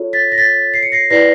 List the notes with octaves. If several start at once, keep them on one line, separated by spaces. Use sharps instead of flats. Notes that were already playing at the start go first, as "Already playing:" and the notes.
Already playing: F4 A4 C#5
A6 B6
A#6
A6 B6
C7
C#7
A#6 C7
E4 G4 B4 D5 A#6 C7